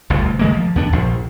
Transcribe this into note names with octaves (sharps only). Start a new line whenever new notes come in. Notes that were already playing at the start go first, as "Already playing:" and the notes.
G1 D2 G2 B2
D#3 G#3 A#3
F3
D#2 B3 D4
A#1 F3